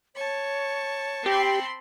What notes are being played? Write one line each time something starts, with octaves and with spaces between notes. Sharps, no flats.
C#5 A5 C#6
C4 G4 G5 B5 C6